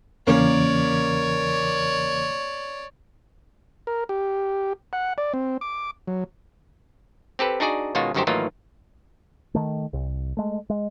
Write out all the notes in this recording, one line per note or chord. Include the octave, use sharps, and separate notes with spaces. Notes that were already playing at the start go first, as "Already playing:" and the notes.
E2 C#3 E3 A#3 C#4 C#5 D5
A#4
G4
F#5
D5
C4
D6
F#3
C4 G4 A4 B4
D4 D#4 F#4 G#4 D5
B2 D#3 G#3 C#4 F4 F#4
G1 F#2 D#3 F#4 G4 C5
A2 D#3 E3 F#3 A#3 F4
D#3 A3
C2
G#3 A3
G#3